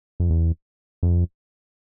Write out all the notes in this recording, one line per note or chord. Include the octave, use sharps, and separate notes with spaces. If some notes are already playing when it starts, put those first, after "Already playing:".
F2
E2
F2